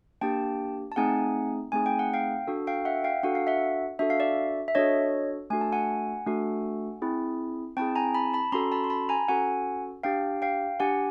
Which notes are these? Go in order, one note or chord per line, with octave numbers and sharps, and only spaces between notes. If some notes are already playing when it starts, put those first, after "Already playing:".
A#3 D4 G4 G5 A5
A5
A3 C4 D#4 G#4 F#5 G#5
A3 C4 D#4 G#4 G#5
G5
F#5
F5 G5
D4 F#4 A4
F5 G5
E5 F#5
F5 G5
D4 F#4 A4 F#5
F5
E5 F#5
D4 F#4 A4 E5
F5
D5 E5
E5
D4 F#4 A4 C#5 D#5
A3 D4 F#4 A4 G#5
A5
F#5 G#5
A3 D4 F#4 A4
C4 E4 G#4
C4 E4 G#4 G5 A5
G#5 A#5
A5 B5
A5 B5
C#4 F#4 A4 A#5 C6
A5 B5
C6
A5 B5
G#5 A#5
C#4 F#4 A4 F#5 G#5
D4 G4 F5 G5
F5 G5
D4 G4 F#5 G#5